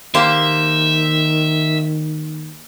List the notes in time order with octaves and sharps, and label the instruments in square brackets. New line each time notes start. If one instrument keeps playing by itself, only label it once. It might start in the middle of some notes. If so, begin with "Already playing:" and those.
[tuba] D#3 [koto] A#3 G4 C5 [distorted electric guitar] E5